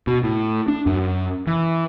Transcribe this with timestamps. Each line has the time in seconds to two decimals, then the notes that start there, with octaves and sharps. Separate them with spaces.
0.07 B2
0.23 A2
0.68 D4
0.86 F#2
1.47 E3